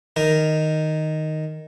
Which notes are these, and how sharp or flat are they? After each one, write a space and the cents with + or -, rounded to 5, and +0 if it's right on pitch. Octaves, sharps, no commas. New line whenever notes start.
D#3 +0 A#4 +0